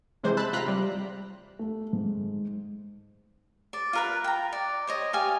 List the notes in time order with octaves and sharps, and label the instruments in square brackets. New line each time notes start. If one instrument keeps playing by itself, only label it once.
[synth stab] C3 E3 G#3 C5
A5 B5 E6 F#6
C3 F4 A#5 C6 F#6 B6
C3 G3
[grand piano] A3
G#2
[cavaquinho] D5
F4 A#4 B4
G5 A#5
D5
C5 C#5 D#5
G4 F5 G#5